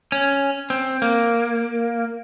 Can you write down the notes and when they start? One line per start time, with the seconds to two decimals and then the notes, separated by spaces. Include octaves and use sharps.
0.12 C#4
0.70 C4
1.02 A#3